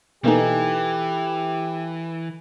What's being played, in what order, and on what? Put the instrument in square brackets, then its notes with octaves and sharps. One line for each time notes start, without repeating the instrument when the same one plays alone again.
[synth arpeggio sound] B2 A#3 D#4 [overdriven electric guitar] E3 [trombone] G4 [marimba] A4 B4 G#5